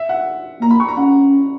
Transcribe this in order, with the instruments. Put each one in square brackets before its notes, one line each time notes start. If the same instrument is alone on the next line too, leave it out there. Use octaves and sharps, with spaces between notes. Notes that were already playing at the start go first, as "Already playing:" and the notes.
Already playing: [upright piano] E5
F#5
[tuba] A#3 [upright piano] A#5
[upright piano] B5
C#6
A#5
[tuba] C#4 [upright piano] F#5